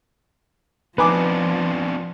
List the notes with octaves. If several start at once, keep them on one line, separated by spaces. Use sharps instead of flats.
F3 B3 C4 D4 D#4 B4 G#5 D6